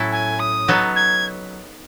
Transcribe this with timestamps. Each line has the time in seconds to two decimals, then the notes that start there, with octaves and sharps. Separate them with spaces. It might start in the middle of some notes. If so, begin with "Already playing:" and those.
Already playing: A2 F#3 C#4 E4 A4
0.12 G#5
0.40 D#6
0.68 F#3 B3 D#4 A4
0.96 G#6